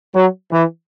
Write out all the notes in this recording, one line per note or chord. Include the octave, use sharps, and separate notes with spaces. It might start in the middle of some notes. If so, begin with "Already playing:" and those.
F#3
E3